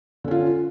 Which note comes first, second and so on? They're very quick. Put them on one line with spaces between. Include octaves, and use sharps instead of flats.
D3 C#4 F4